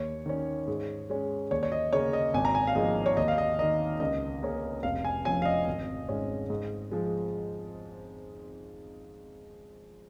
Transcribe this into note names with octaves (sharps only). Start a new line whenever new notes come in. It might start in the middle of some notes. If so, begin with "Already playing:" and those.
Already playing: D#2 C#5
D#3 C#4
G#2
G#3 C#4
D#2 C#5
C#5
D#5
C#3 A#3 C#4 C#5
D#5
G#1 G#5
A#5
G#5
F5
G#2 F3 A#3 D#5
C#5
D#2 D#5
F5
D#5
D#3 A#3 D#5
C#2 D#5
C#3 A#3 C#4
F1 F5
G#5
F2 F3 C#4 G#5
F5
D#5
G#1
G#2 G#3 C#4
G#2
F3 G#3